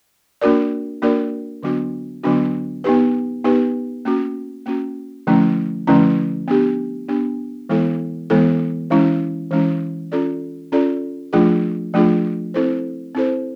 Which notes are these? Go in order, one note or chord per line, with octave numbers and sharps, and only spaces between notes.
A#3 D4 F#4 A#4 D5
A#3 D4 F#4 A#4 D5
D3 F#3 B3 D4 F#4
D3 F#3 B3 D4 F#4
B3 D#4 G4 B4
B3 D#4 G4 B4
A#3 C#4 F#4
A#3 C#4 F#4
D3 F3 A3 C#4 E4
D3 F3 A3 C#4 E4
B3 D4 G4
B3 D4 G4
E3 G#3 B3 E4 A4
E3 G#3 B3 E4 A4
E3 G#3 C#4 E4
E3 G#3 C#4 E4
C#4 F4 A4 D5
C#4 F4 A4 D5
F3 A3 D4 F4 G#4
F3 A3 D4 F4 G#4
C4 E4 A4 C5
C4 E4 A4 C5